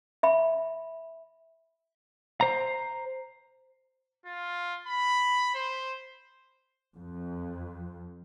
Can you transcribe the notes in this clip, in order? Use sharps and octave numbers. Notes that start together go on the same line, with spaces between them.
E5 B5
C5 A#5
F4
B5
C5
F2